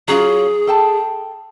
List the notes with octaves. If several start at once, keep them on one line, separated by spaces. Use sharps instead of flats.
F#3 C#4 F4 G#4
A4 G5 A5